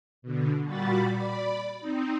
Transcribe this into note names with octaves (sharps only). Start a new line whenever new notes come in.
B2 D3
A#2 G3 F#4 B5 A6
D5 B5
C4 D#4